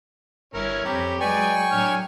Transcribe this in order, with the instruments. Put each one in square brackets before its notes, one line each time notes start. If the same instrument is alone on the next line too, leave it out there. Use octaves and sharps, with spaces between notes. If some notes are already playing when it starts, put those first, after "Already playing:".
[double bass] G1 [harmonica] C#4 E4 A#4
[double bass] F2 C4 [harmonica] C#4 G4 [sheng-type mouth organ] A#5 B5
[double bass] F#3 G#3 [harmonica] B4 D5 [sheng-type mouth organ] G5 G#5 C#6
[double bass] A2 F#3 [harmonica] D3 C#5 F6